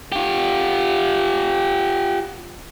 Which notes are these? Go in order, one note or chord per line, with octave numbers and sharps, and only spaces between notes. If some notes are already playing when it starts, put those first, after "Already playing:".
F4 G4